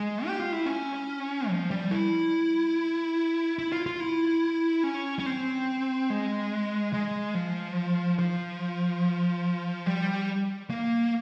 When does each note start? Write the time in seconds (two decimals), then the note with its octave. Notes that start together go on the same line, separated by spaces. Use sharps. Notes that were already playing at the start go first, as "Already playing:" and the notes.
Already playing: G#3
0.27 G4
0.39 F4
0.52 E4
0.66 C#4
1.49 F3
1.71 G3
1.91 E4
3.59 E4
3.72 F4
3.86 F4
4.00 E4
4.84 C#4
5.19 C#4
5.26 C4
6.10 G#3
6.93 G#3
7.34 F3
8.19 F3
9.86 G3
10.70 A#3